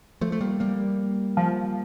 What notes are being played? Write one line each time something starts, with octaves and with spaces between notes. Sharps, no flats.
F3 A3
A3
G3 A#3
G3 A#3
F3